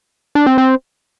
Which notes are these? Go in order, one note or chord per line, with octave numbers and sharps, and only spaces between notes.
D4
C4
C4